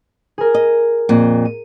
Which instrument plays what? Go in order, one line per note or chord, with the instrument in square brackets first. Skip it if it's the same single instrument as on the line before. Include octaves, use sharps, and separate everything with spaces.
[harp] G#4 A#4
[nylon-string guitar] D#5
F2 A#2
[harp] D#7